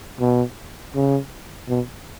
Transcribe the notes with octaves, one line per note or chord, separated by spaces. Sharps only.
B2
C#3
B2